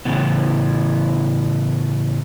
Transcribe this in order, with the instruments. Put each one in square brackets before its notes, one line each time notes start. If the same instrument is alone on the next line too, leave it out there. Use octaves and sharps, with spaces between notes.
[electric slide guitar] A2 C#3 E3 B3